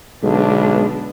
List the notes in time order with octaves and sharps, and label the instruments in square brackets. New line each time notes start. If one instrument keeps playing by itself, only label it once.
[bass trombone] B1 [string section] D3 B3 D4 [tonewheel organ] G#3